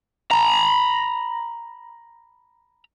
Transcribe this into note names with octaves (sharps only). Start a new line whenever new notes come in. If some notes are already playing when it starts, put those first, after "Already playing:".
A#5 B5